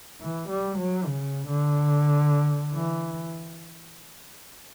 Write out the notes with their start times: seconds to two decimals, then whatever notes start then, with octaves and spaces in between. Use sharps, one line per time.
0.21 E3
0.49 G3
0.78 F#3
1.05 C#3
1.47 D3
2.74 E3